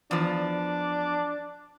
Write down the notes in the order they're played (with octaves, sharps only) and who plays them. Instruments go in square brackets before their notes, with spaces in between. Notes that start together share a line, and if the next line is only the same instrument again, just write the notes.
[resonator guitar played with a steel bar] E2 F3 [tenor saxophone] D4